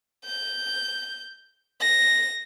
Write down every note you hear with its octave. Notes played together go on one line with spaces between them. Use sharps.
G6
A#6